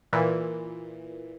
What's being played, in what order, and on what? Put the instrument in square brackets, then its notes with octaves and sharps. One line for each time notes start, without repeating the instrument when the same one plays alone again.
[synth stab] A#2 E3